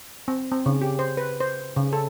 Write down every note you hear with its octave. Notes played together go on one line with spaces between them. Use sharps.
C4
C4
C#3
G4
C5
B4
C5
C#3
A4